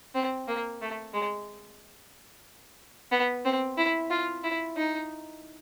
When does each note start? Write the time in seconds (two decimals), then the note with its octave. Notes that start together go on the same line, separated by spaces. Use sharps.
0.15 C4
0.48 A#3
0.81 A3
1.14 G#3
3.11 B3
3.45 C4
3.77 E4
4.11 F4
4.44 E4
4.77 D#4